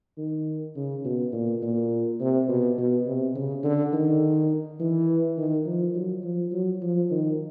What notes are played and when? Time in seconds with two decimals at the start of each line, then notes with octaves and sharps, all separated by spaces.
0.18 D#3
0.76 C#3
1.04 B2
1.33 A#2
1.63 A#2
2.20 C3
2.49 B2
2.78 B2
3.07 C3
3.35 C#3
3.64 D3
3.93 D#3
4.80 E3
5.38 D#3
5.66 F3
5.95 F#3
6.24 F3
6.52 F#3
6.82 F3
7.11 D#3